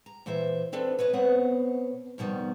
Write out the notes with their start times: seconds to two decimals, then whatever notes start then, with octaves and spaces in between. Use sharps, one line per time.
0.06 A#5
0.26 A#2 E3 C5 E5
0.72 B3 C4 D4 A4 B4
0.99 B4 C#5 D#5 E5
1.13 B2 B3 C4 C#5 F#5
2.18 F2 B2 D#3 G3